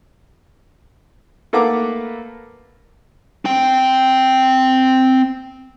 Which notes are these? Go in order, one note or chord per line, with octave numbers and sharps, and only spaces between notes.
A3 A#3 B4 F5 F#5 D6
C4 G5